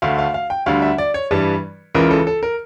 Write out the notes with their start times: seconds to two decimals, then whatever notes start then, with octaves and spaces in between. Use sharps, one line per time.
0.02 D2 D3 A3 F5
0.19 F5
0.34 F5
0.50 G5
0.66 D2 D3 G3 F5
0.82 E5
0.98 D5
1.14 C#5
1.31 G2 E3 G3
1.95 C#2 C#3 E3 A#4
2.11 A4
2.27 A4
2.43 A#4